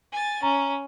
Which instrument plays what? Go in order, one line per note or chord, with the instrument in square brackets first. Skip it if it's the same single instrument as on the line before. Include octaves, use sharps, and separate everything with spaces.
[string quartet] G#5 A6
[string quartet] C#4 [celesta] A#5